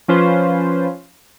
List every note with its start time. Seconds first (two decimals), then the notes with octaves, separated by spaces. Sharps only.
0.08 F3 C#4 F4 B4 C5